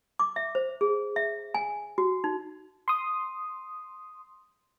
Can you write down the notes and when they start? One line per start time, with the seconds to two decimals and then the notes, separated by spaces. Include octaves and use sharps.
0.19 D6
0.36 E5
0.55 C5
0.81 G#4
1.16 E5
1.54 G#5
1.98 F#4
2.24 D#4
2.88 C6 D#6